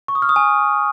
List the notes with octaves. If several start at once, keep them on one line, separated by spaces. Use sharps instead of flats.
C#6
D#6
F6
D#6
G#5